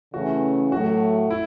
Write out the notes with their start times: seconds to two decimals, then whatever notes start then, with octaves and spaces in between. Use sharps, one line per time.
0.14 C#3 E3 A3 C#4 F#4
0.72 A2 F#3 A3 F#4
1.30 E4